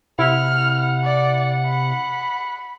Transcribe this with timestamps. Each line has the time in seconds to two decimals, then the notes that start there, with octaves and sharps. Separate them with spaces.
0.19 C3 E4 F#5 F6
1.03 D5
1.66 B5